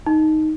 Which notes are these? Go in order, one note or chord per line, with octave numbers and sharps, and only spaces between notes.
D#4